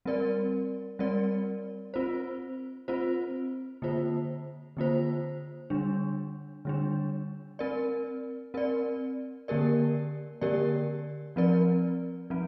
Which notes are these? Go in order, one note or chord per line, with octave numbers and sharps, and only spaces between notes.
G3 C4 A#4 D5
G3 C4 A#4 D5
C4 F4 C5
C4 F4 C5
D3 A#3 F4 C5
D3 A#3 F4 C5
D3 G3 D4
D3 G3 D4
C4 A#4 D5
C4 A#4 D5
D3 A#3 G4 A#4 D5
D3 A#3 G4 A#4 D5
F3 C4 A#4 D5
F3 C4